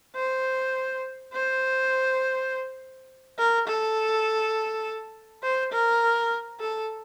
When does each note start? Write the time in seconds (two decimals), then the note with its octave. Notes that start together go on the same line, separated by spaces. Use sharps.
0.16 C5
1.33 C5
3.38 A#4
3.67 A4
5.43 C5
5.72 A#4
6.60 A4